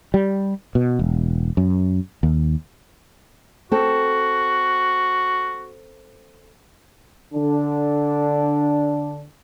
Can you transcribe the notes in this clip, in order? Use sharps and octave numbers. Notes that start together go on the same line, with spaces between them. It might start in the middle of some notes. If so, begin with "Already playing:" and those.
G3
B2
E1
F#2
D#2
C4 F#4 A4
D3 D4